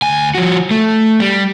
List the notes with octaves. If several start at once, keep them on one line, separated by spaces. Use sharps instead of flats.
D2 G#5
F3 F#4
A3
G3